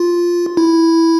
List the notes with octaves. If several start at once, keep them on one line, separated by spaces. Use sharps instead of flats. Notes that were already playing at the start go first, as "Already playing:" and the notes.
Already playing: F4
E4